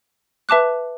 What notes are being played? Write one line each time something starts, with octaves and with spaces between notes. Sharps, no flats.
B4 E5 A5 D6 F#6